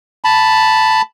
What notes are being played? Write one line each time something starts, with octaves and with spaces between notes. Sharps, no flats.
A5 B5